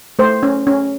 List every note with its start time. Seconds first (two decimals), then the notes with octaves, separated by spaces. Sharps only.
0.19 A3 C5
0.43 C#4
0.67 C#4